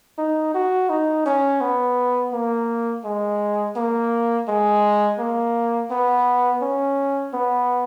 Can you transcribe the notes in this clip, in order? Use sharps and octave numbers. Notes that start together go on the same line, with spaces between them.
D#4
F#4
D#4
C#4
B3
A#3
G#3
A#3
G#3
A#3
B3
C#4
B3